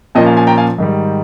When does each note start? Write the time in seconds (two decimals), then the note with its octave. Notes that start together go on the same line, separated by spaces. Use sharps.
0.15 A#2 F3 A#3 C#4 D#5 G5
0.26 F5 G#5
0.37 F5 G#5
0.47 G5 A#5
0.57 F5 G#5
0.78 G#2 D#3 G3